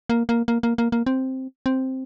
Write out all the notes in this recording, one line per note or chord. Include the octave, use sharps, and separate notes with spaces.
A#3
A#3
A#3
A#3
A#3
A#3
C4
C4